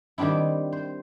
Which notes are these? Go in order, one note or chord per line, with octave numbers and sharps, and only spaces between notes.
D#3 G3 C4 D4 E4
C5